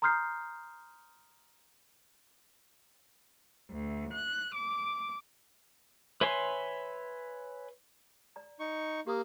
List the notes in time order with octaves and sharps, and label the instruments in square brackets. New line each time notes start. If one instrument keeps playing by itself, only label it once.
[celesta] A#5 C6 D#6 F6 G6 C7
[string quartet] D2
F#6
D6
[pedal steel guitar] B4 C#5 E5 G#5 C6
[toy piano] D5 A#5
[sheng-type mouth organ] D#4 C#6
[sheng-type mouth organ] A#3 [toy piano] G4 D#6